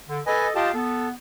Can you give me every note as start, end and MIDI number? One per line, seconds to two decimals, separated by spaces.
0.09 0.20 50
0.27 0.50 69
0.27 0.47 71
0.27 0.50 75
0.27 0.47 80
0.55 0.71 65
0.55 0.71 67
0.55 0.71 75
0.55 0.74 77
0.55 0.74 79
0.55 0.74 81
0.74 1.10 59
0.74 1.08 69